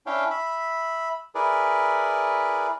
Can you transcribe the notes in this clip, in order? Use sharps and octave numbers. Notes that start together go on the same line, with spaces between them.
C#4 D4 E4 C#5 F5 G5
E5 B5
E4 G#4 A#4 B4 D5